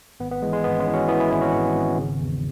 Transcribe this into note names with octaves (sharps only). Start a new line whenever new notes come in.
G#1 B3
B3
E3 G#3
G#3
G#1 B3
G#3 C#4
E3
C#4 F#4
E3 B3 E4
B3 E4
G#1 B3 E4
C#4 F#4
G#1
G#1
C#3
E2